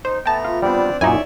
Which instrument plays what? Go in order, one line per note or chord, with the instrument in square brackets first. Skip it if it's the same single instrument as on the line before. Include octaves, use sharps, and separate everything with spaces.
[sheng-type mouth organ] D#4 [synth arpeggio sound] C5
[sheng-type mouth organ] A3 B3 A#5 [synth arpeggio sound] G5 A5
[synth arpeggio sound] F4
[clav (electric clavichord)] G3 B3 [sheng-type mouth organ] C4 D4 D5
[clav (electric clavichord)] F#2 A#2 [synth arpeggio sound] D#4 E4 G#5 [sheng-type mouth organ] C#5 D5 E5